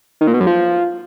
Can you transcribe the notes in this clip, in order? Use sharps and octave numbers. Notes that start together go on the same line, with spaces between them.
D#3
A#2
B2
F#2
F3